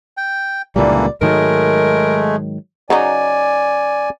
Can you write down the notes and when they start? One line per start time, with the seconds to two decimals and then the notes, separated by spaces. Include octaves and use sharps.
0.17 G5
0.76 C#2 A#2 D3 E3 G3 A#3 D5
1.21 G#2 D#3 F#3 G#3 A3 A#4
2.90 C#3 F#3 D#4 D5 G#5